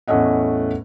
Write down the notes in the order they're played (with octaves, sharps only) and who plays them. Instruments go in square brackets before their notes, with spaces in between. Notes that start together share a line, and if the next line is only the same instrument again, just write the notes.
[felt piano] E2 A2 A3 C#4 D#5 F#5